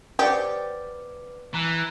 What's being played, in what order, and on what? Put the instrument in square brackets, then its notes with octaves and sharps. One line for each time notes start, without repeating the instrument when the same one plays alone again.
[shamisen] G4 [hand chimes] B4 D6 [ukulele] C5 D5 F#5
[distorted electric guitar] E3 [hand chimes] A#5 F#6